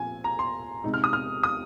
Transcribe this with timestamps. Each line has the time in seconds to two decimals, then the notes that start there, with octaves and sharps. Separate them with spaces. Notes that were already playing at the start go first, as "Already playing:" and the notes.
Already playing: A#2 F3 C4 G#5
0.24 A#5
0.39 C6
0.84 C3 G#3 D#4
0.94 F6
1.04 D#6
1.13 F6
1.43 D#6